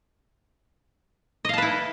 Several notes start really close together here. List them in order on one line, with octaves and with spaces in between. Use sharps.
D#5 F5 A5 B4 E4